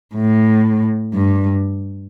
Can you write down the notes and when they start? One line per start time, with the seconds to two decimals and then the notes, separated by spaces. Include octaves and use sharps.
0.15 A2
1.13 G2